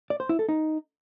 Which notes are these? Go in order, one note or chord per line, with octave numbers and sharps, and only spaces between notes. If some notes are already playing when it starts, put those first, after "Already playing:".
D5
C5
E4
A4
D#4